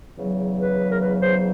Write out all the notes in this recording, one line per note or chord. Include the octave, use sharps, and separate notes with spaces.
E2 C#3 F#3
B4
A#4
B4
C5